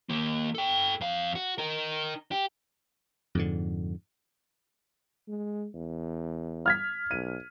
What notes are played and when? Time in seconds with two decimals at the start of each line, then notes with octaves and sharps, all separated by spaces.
0.10 D#3 A#3
0.55 A4 G5
1.01 F2 F5
1.35 F#4
1.58 D#4 A#4
2.32 G4
3.35 F2 G#2 D3
5.28 G#3
5.74 E2
6.66 F6 G#6 B6
7.11 B1 D#7